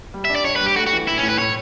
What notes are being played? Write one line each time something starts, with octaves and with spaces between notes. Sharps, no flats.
G3
E5
D4
D5
D4 C#5
B4
G3
G4
A3 F#4
F#4
E3
A2 E4
C#4
A2
B4
A2 C#5